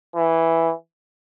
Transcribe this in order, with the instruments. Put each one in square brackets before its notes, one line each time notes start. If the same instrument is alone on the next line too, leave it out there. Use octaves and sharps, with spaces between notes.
[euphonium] E3